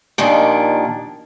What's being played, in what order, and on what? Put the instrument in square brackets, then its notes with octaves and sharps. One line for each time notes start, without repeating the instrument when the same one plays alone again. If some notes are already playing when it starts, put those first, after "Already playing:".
[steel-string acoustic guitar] D#2 A#2 D#3 F3 D4